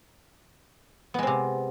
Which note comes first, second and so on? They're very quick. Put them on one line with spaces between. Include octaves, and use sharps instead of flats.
B3 G#3 C4 C3